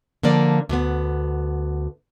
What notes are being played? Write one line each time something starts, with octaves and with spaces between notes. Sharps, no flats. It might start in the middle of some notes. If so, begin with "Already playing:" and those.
D3 F3 A#3 D5
D2 B3